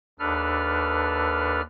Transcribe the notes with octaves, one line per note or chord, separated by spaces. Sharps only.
D#2 D4 A4 B4 F6